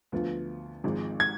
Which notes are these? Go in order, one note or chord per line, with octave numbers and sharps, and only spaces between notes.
D2 D3 F3 B3 F4
G#1 G#2 F3 G#3
G#6